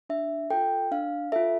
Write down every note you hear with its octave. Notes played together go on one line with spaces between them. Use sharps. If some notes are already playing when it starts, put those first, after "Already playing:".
D4 E5
F4 A4 G5
D4 F5
F4 A4 E5